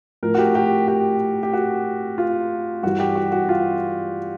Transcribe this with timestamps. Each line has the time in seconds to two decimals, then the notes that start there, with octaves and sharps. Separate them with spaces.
0.23 A2 F3 A#4
0.34 F#4
0.38 G4
0.55 G4
0.88 G4
1.43 G4
1.53 F#4
2.18 F4
2.83 G2 E3 G3 F#4
3.00 G4
3.16 F#4
3.32 F#4
3.49 F4